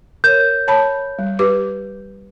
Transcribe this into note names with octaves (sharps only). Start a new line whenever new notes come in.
A#4 C#5 G6
C#5 A5 B5
G3
G4 B4 D6